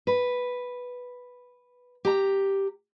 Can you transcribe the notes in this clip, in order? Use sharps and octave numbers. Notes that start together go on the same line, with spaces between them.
B4
G4 A#5